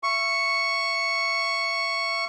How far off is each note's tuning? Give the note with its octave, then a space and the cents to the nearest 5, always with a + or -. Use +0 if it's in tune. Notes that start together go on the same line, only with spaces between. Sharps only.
E5 +35 C#6 +0